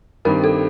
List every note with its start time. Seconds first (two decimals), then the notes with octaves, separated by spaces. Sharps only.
0.25 G2 D#3 G3 C4 G4 A#4
0.44 A4